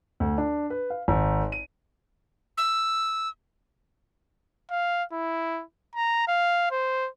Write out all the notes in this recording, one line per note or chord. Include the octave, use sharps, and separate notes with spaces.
D2
D4
B4
F5
G#1
D#7
E6
F5
E4
A#5
F5
C5